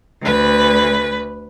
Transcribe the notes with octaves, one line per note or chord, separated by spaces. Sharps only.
D2 B4